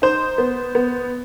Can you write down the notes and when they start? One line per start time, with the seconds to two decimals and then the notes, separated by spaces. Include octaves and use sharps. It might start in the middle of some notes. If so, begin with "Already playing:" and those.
0.02 D#4 C5
0.38 B3
0.75 B3